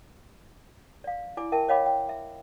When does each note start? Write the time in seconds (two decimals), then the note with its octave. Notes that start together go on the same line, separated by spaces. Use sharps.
1.04 D5 F5
1.37 E4 D5 G#5 D6
1.52 A#4 E5 G5 A5
1.69 C#5 D#5 F5 G5 B5 D6
1.86 G5
2.09 E5